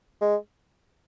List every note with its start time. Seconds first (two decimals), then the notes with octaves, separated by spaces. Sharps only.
0.21 G#3